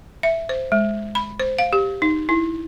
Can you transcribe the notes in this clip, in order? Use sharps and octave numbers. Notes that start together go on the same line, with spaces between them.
E5
C5
G#3
B5
C5
F5
G4
D#4
E4